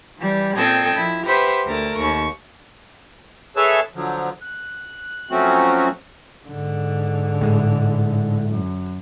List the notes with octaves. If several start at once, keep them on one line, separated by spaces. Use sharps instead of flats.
E3 G3
A#2 C4 A4 D#5 G5 G#6
F3 E4
G4 B4 C5 E5 F#5
D2 A3 A#4 A5
D#2 C#6
G#4 A4 B4 C#5 E5 A5
D3 F3 F#3
F#6
F3 F#3 A3 C4 C#4 F#4
G#2 D3
A2 G#3
F#2